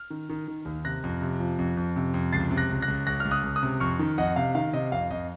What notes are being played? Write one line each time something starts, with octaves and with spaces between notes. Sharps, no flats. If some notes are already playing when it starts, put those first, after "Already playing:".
Already playing: F6
D#3
D#3
D#3
D#2
C3 F#6 A#6
F2
C3
F3
F2
F2
C3
F2
C#2 A6 C7
C3
F#6 A#6
C#2
F#6 A#6
C#2
C#2 F#6 A#6
F6
C#2
D#6 F#6
C#2
D#6 F#6
C3
F2 C#6 F6
D#3
F2 D#5 F#5
C3 F5
D#3 F5
C3 D#5
F2 F5
F2 D#5